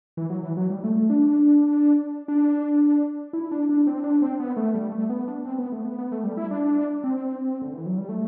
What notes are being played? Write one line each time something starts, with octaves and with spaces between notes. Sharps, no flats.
E3
F#3
E3
F#3
G3
A3
A3
D4
D4
E4
D4
D4
C4
D4
C4
B3
A3
G3
A3
B3
D4
C4
B3
A3
B3
B3
A3
G3
E4
D4
C4
D3
E3
F#3
G3
A3